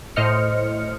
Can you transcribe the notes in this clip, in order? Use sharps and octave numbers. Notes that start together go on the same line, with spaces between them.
A2 C5 D#5 F6 C#7